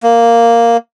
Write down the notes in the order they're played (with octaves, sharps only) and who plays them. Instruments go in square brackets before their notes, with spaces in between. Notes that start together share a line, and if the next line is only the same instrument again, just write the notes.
[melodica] A#3